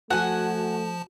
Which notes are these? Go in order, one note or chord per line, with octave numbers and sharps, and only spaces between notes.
F3 A3 F#4 F#5 G#5 A5